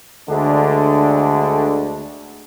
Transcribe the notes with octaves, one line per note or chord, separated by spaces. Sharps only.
D2 D3 G#3 D4